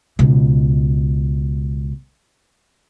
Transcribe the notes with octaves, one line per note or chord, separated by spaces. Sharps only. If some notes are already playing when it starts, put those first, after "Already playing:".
C#2 B2